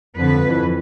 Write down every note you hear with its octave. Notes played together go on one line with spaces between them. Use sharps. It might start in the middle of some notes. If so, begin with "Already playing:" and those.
F2 D3 B4
F2 E3